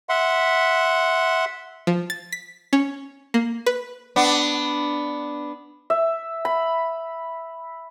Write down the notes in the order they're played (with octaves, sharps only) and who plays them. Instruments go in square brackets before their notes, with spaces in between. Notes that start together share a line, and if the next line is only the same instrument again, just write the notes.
[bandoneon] E5 F#5 C6
[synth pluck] F3
A6
B6
C#4
A#3
B4
[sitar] B3 D4
[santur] E5
B5